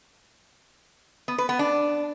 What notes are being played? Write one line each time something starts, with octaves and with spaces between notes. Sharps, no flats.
B3
B4
B3
D4